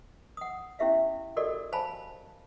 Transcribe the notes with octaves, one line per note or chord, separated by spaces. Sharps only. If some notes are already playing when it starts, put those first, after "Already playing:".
F#5 D#6
C#4 E4 G4 E5 F5
F#4 G4 A4 A#4 D5 D#5
C5 F5 G#5 A5 B5